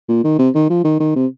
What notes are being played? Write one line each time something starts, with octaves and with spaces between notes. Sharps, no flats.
A#2
D#3
C3
D#3
F3
D#3
D#3
C3